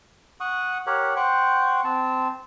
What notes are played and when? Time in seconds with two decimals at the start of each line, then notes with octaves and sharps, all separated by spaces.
0.40 F#5 C#6 D#6
0.87 G4 A#4 C#5 F#5
1.16 C5 F#5 G5 C#6
1.84 C4 A5